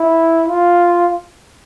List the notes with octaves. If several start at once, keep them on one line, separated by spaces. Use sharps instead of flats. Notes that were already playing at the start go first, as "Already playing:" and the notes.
Already playing: E4
F4